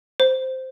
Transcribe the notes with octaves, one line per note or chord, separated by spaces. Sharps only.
C5